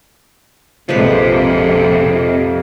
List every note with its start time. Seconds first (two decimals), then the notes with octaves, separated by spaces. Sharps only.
0.89 A#1 F2 C3 F3 G#3 B4